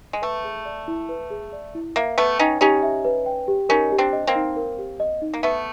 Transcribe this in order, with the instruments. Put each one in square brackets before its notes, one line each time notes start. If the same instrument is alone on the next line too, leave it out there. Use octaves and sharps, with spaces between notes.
[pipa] G#3
[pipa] A3 [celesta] B4
[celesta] G#4
D5
E4
B4
G#4
D5
E4
[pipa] A#3 [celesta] E5
[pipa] A3 B3 [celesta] B4
[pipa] C#4 D#4 [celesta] G5
[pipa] C#4 D#4 [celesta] G4
[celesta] E5
B4
G5
G4
[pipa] C#4 D#4 [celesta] A#4
[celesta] G4
[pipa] C4 D4
[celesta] D#5
[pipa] A#3 C4
[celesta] D#4
A#4
G4
D#5
D#4
[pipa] A#3
[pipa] A3 B3 [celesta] E5